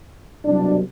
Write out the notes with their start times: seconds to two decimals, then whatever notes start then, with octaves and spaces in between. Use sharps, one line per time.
0.46 C2 B2 F#3 D4